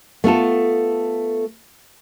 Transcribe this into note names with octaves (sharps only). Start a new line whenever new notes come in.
A3 B3 F4 A4